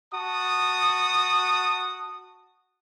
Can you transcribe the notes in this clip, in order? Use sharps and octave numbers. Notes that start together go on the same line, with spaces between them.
F#4 A5 D#6